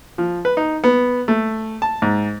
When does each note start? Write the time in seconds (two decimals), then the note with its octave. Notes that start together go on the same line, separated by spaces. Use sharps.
0.18 F3
0.45 B4
0.57 D#4
0.84 B3
1.28 A3
1.82 A5
2.02 G#2